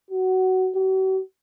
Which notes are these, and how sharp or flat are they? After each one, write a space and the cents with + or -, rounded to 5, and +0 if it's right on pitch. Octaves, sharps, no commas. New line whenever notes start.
F#4 +15
F#4 +45